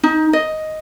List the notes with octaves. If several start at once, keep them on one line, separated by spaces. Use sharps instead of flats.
D#4
D#5